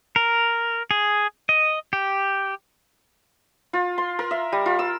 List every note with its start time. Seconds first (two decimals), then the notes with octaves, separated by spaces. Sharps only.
0.16 A#4
0.91 G#4
1.49 D#5
1.93 G4
3.73 F4
3.98 C6
4.19 A#4
4.31 E5
4.52 G3
4.66 F4
4.79 E6